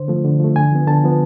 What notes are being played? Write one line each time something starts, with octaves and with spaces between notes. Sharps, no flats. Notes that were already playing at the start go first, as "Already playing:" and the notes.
Already playing: D3 C5
F3 A3
D3
F3 A3
D3 G#5
F3 B3
D3 A5
F3 B3